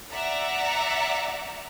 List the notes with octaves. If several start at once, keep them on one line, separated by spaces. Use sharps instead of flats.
D5 E5 F#5 A#5